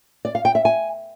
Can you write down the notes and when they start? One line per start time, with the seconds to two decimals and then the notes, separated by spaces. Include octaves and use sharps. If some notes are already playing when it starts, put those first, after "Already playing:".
0.25 D5
0.35 F5
0.45 G5
0.55 E5
0.65 G#5